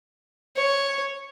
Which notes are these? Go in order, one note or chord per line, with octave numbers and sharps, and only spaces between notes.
C#5